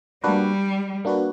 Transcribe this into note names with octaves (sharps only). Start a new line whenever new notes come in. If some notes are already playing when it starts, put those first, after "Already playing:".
G3 A#3 D4 F#4 B4
A#3 D4 F#4 B4